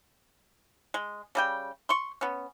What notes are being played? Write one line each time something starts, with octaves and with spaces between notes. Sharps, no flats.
G#3
C#3 G3 G5
C6 C#6
B3 C#4